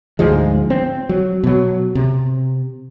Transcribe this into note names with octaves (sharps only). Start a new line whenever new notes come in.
D2 G#2 F3 G#3
C4
F#3
B2 F#3
C3